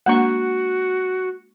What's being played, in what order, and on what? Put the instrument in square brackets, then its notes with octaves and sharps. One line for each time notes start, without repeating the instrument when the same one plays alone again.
[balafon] G#3 A#3 D4 [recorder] F#4 [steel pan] F#5 C#6